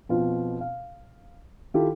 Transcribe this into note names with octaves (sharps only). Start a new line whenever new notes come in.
F2 B2 F4
F5
D#3 E4 F4 G4 A4